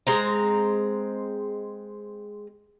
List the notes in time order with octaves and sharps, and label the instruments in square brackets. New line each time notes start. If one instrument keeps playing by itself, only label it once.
[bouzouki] G#3 C4 A#5